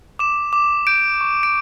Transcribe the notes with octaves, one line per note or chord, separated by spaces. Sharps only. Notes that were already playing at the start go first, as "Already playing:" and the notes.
D6 E7
D6
G6 D7
C#6
D7